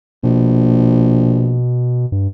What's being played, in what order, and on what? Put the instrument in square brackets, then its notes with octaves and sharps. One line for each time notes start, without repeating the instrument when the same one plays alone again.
[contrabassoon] A#1 [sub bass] B2
[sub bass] G2